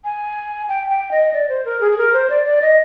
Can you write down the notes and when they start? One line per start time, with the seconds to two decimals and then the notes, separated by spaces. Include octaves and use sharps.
0.04 G#5
0.69 G5
0.90 G5
1.11 D#5
1.34 D5
1.49 C5
1.65 A#4
1.81 G#4
1.92 G#4
1.98 A#4
2.13 C5
2.30 D5
2.45 D5
2.62 D#5